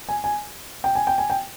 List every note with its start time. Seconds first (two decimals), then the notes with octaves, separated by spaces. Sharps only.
0.09 G#5
0.24 G#5
0.84 G5
0.95 G#5
1.07 G5
1.18 G#5
1.30 G5